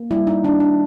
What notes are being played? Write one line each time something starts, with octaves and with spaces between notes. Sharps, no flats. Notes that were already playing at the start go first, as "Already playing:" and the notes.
Already playing: A#3
G3 E4
D#4
D#3 D4
D4